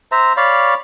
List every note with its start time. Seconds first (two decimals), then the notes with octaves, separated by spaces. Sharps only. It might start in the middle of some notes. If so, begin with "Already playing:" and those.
0.12 C5 E5 A#5
0.37 C#5 D5 F5 B5